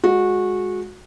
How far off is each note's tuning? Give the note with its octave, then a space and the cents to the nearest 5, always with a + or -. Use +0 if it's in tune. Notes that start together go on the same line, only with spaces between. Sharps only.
G#3 +0 F#4 -20